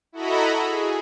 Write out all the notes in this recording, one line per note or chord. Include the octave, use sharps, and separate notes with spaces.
E4 F#4 A4 D#5 A#5 B5
G#4